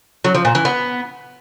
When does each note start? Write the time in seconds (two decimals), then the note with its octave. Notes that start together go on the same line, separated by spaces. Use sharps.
0.24 F#3
0.35 F3
0.45 A#2
0.55 E3
0.65 B3